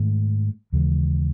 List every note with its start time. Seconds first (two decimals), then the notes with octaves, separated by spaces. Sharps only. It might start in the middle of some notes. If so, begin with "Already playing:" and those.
Already playing: G#2 D#3 A3
0.72 D#2 C#3 E3 G#3